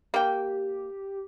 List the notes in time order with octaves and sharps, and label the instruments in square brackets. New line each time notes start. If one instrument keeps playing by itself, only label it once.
[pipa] A#3 G5 [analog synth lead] G4